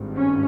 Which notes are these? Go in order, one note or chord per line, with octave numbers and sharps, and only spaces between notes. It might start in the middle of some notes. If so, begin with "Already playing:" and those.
Already playing: G#1 G2
C#4